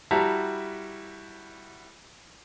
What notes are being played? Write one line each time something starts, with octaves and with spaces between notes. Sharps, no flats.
G3 E4 F#4 A5 A#5 B6